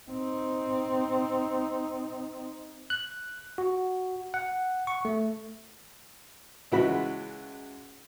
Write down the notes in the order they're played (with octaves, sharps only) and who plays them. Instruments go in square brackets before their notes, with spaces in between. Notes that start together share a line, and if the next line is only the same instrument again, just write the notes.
[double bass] C4 D#4
[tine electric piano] F#6
F#4
F#5
C#6
A3
[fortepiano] C#2 E3 G#3 F#4 B5